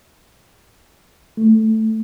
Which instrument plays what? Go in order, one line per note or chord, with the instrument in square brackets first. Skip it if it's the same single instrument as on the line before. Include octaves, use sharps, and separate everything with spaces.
[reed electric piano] A3